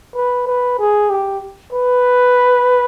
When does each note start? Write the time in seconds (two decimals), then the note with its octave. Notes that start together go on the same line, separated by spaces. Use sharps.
0.15 B4
0.47 B4
0.79 G#4
1.10 G4
1.73 B4